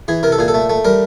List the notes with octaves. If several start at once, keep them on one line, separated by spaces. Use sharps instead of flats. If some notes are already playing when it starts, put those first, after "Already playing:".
E3 G#4
C3 A#4
A4
A#2 G#4
A4
A3
A3
G3 A#4